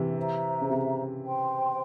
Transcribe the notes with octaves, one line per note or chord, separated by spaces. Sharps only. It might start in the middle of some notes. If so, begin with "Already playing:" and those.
Already playing: C3 E3
C5 E5 A#5
C#3
C3
C5 G5 C6